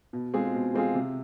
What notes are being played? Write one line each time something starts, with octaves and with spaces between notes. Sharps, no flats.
B2
G#3 C4 F4 G#4
B2
G#3 C4 F4 G#4
C3